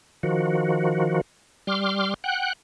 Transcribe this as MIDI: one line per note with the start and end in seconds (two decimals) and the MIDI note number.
0.23 1.21 51
0.23 1.21 53
0.23 1.21 66
1.67 2.14 55
1.67 2.14 84
1.67 2.14 86
1.67 2.14 89
2.24 2.53 78
2.24 2.53 79
2.24 2.53 90